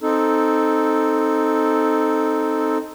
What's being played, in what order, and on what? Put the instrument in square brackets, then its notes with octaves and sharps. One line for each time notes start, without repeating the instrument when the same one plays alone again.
[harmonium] C4 D#4 A4